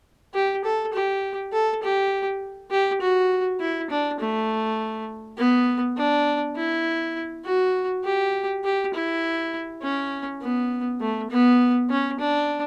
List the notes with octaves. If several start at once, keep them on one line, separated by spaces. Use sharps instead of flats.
G4
A4
G4
A4
G4
G4
F#4
E4
D4
A3
B3
D4
E4
F#4
G4
G4
E4
C#4
B3
A3
B3
C#4
D4